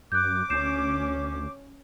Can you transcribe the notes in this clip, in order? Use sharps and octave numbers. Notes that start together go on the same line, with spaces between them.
F#2 D6 F#6 G6
D2 C#4 G6 C7 E7